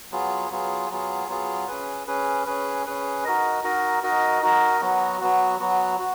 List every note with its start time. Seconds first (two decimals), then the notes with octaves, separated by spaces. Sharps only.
0.11 F#3 B3 F4 G#4
0.50 F#3 B3 F4 G#4
0.90 F#3 B3 F4 G#4
1.28 F#3 B3 F4 G#4
1.68 C#4 G#4 B4
2.07 C#4 G#4 B4
2.46 C#4 G#4 B4
2.86 C#4 G#4 B4
3.25 D#4 F#4 A#4 D#5
3.63 D#4 F#4 A#4 D#5
4.03 D#4 F#4 A#4 D#5
4.42 D#4 F#4 A#4 D#5
4.81 F#3 B3 F#4
5.21 F#3 B3 F#4
5.60 F#3 B3 F#4
5.99 F#4